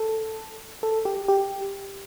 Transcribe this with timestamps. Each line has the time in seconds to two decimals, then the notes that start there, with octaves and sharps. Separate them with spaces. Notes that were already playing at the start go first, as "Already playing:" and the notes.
Already playing: A4
0.83 A4
1.05 G4
1.28 G4